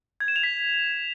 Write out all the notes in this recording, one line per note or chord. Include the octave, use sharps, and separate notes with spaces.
G#6
E7
F7
B6